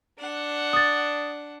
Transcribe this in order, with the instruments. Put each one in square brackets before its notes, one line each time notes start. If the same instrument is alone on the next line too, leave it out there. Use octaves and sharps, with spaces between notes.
[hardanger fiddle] D4 F#5
[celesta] D#6 A6